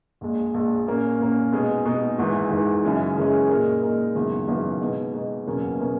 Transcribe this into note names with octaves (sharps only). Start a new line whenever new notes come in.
A#1 A#2 G#3
A#1 A#2 G#3
A#2 A#3 C#4
A#2 A#3 C#4
B2 G#3 D#4 G#4
B2 G#3 D#4 G#4
G#1 G#2 E3
G#1 G#2 E3
F#2 C#3 E3 G#3 C#4
F#2 C#3 E3 G#3 C#4
A#2 G#3 D#4 A#4
A#2 G#3 D#4 A#4
G#1 F#2 C#3 E3 B3
G#1 F#2 C#3 E3 B3
B2 G#3 D#4
B2 G#3 D#4
F#1 E2 B2 A#3 C#4
B2 A#3 C#4